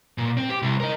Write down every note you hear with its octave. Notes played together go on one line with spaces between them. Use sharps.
A#2
C4
G4
C2
A#4 D#5